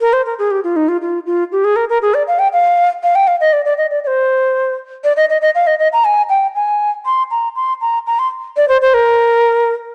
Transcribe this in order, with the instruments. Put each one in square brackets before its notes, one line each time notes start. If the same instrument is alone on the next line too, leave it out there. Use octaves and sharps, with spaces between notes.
[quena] A#4
C5
A#4
G#4
G4
F4
D#4
F4
F4
F4
G4
G#4
A#4
A#4
G#4
D5
F5
G5
F5
F5
G5
F5
D#5
D5
D5
D#5
D5
D5
C5
D5
D#5
D#5
D#5
F5
D#5
D#5
A#5
G#5
G5
G#5
C6
A#5
C6
A#5
A#5
C6
D5
C5
C5
A#4